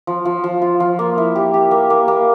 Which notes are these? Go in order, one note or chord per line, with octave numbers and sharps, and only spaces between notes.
F3
F3
F3
F4
F3
A#3
E4
G4
G4
A#3
A#3
A#3